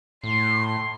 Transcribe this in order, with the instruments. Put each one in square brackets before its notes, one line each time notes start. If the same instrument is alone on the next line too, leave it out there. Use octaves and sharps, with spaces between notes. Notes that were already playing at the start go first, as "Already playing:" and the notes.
[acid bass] A2 [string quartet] C6